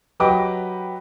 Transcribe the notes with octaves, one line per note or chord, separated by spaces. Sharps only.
F#3 G4 B4 D#5 G5 D6